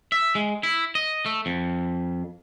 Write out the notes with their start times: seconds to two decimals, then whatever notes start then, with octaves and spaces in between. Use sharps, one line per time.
0.12 E5
0.35 G#3
0.63 E4
0.95 D#5
1.26 A3
1.46 F2